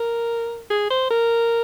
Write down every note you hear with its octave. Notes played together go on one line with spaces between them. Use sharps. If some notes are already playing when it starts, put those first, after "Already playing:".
Already playing: A#4
G#4
C5
A#4